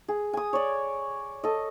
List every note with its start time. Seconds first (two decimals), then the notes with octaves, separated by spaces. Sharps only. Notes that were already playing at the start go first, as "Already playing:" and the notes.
0.08 G#4
0.33 G#5 D#6
0.53 C#5 D5
1.43 A4 D#5